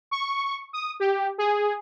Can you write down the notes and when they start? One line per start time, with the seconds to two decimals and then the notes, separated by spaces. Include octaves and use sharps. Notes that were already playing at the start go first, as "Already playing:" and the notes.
0.11 C#6
0.73 D#6
1.00 G4
1.38 G#4